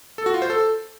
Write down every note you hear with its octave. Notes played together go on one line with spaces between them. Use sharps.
A4
F#4
F4
C5
A4